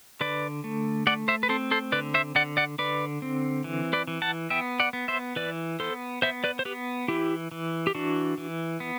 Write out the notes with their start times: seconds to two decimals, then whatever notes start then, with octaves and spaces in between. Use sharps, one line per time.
0.21 D3 B4 D5
0.64 A3
1.07 A3 D5 F#5
1.28 C5 E5
1.43 B4
1.49 C4 A4 C5
1.71 A4 C5
1.92 D3 B4 D5
2.14 C5 E5
2.35 D3 D5 F#5
2.57 D5 F#5
2.79 D3 B4 D5
3.22 C4
3.64 E3
3.93 B4 D5
4.07 E3
4.22 F#5 A5
4.50 B3 E5 G5
4.80 D5 F#5
4.93 B3
5.08 C5 E5
5.36 E3 B4 D5
5.80 B3 A4 C5
6.22 B3 C5 E5
6.44 B4 D5
6.59 C5
6.65 B3 G4 B4
7.08 E3 E4 G4
7.52 E3
7.87 G4
7.95 E3 D4 F#4
8.38 E3
8.80 B3